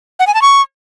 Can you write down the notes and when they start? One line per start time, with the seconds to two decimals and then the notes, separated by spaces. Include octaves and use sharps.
0.20 F#5
0.27 G#5
0.34 A5
0.42 C#6